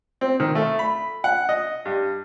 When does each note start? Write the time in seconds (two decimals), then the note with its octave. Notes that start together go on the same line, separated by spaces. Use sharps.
0.21 C4
0.40 D#3
0.55 A3
0.79 B5
1.24 F#5
1.49 D#5
1.85 G2